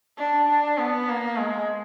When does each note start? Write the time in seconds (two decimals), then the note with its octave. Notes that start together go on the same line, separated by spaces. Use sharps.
0.18 D4
0.48 D4
0.78 B3
1.09 A#3
1.39 G#3